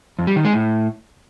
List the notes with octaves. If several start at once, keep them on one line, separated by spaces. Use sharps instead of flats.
F2
G3
D#3
G#3
A2